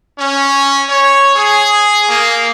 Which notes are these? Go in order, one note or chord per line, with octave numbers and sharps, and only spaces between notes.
C#4
C#5
G#4
A#3